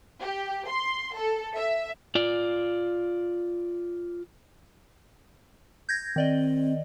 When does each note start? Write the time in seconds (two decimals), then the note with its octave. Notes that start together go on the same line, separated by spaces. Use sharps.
0.20 G4
0.68 C6
1.16 A4
1.56 E5
2.15 F4 D5
5.89 G6 G#6 A#6
6.16 D#3 C4 D5 D#5